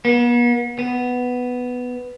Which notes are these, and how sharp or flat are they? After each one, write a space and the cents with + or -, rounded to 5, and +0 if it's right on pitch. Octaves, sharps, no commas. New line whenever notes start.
B3 -45
B3 +5